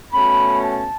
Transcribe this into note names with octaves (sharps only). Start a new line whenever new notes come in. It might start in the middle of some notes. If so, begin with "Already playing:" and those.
B2 A3 C#4 B5
A5